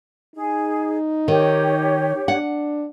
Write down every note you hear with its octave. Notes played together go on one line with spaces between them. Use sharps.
D#4 G#4
D#3 G4 C#5
D4 F#5